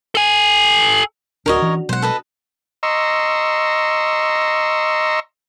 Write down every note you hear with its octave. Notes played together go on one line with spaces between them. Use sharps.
A4 G#5
D1 C#4 D4 F#4 A#4 C#5 D#5
E3 C#4
B2 F#3 G#3 C5 F#5
A4 B4 D#5
D#5 A#5 C6 C#6 E6